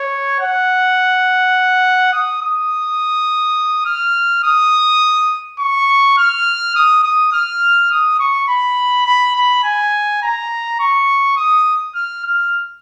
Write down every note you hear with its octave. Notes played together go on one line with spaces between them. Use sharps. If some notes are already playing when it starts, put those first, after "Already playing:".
Already playing: C#5
F#5
D#6
D#6
F6
D#6
C#6
F6
D#6
D#6
F6
D#6
C#6
B5
B5
B5
G#5
A#5
C#6
D#6
F6
F6